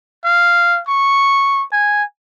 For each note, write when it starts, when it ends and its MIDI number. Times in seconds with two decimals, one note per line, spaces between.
0.24 0.80 77
0.88 1.63 85
1.72 2.03 80